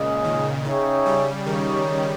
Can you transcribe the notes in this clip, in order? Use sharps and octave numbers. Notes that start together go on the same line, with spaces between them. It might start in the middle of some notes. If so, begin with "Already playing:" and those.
Already playing: A#2 C#3 G#3 C#4 G#4 D#5
D#3
C#3 D#4 G#4 C#5 E5 G5
G3
D#3 D#4 G4 C#5